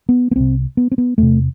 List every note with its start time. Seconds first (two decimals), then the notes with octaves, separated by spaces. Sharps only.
0.09 B3
0.31 B3
0.36 C2 C3 C4
0.77 B3
0.91 C4
0.98 B3
1.18 E2 C3 A3